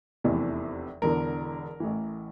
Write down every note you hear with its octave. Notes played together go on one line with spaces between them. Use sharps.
F1 E2 C3 E3
E1 E2 D3 A#4
A1 A2 E3